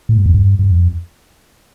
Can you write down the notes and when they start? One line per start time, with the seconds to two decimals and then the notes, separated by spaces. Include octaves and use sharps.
0.09 A2
0.18 G2
0.26 F2
0.34 G2
0.59 G2
0.71 F2